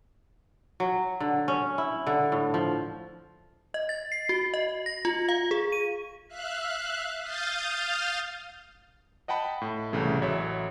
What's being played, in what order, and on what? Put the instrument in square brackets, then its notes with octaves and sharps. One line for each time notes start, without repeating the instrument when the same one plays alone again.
[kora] F#3
D3
C#4
E4
D3
A2
F3
[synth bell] D#5
A6
C7
F#4
D#5
A#6
F4
F5
G#4
D#7
[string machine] E5 F5 F#6
F5 D#6 F6 G6 A6
[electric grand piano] D#5 F#5 G5 A5 B5
A2
C2 F2 A2 C#3 E3 A3
A1 F#3 C#5 E5